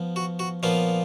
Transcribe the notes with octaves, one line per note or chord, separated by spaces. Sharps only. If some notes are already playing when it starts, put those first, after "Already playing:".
Already playing: F3 B3
F#4
F#4
A#2 F3 B3 F4